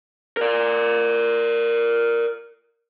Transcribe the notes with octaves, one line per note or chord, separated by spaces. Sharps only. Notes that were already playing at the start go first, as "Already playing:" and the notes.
A#4 D5